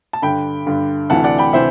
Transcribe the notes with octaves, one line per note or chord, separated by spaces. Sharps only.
A5
G2 D3 G5 B5
G2 D3
D2 C3 E3 F#5 A5
D5 F#5
G5 B5
C3 E3 C5 E5